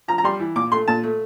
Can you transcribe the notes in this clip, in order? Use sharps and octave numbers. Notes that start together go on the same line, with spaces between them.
F3 A#5
A#5
G3 C6
E3
A#2 D6
A3 C6
A#2 A5
A3